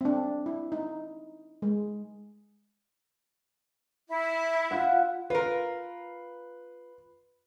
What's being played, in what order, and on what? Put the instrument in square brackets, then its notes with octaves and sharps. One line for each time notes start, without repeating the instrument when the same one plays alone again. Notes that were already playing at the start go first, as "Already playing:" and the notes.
[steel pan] C4 D4
E4
D#4
G#3
[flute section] E4
[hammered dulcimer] F4 E5 F#5
[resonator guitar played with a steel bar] F4 A#4 [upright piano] B4